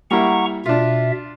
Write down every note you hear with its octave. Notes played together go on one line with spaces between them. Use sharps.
G3 A#3 E4 F#5 A#5 C#6
B2 D4 F4 E5